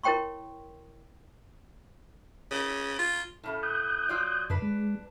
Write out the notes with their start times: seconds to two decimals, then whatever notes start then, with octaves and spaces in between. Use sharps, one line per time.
0.03 E4 A#4 C#5 G5 C6 C#6
2.51 C#3
2.99 F4
3.44 A2 C#3 A3
3.63 D#6 F#6 G6
4.09 F#3 F4 D5
4.50 F#2 D3 D4 B4
4.62 G#3